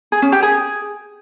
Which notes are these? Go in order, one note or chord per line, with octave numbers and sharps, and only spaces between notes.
G#4
C#4
G4
G#4